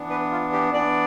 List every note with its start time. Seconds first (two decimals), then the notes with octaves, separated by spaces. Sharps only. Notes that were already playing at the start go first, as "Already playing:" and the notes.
Already playing: E3 B3 D4
0.10 B4
0.31 F4
0.53 G4
0.73 E3 B3 D4 D5